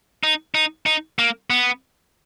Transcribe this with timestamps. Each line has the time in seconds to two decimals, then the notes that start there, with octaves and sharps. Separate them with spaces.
0.23 D#4
0.55 D#4
0.86 D#4
1.19 A#3
1.50 B3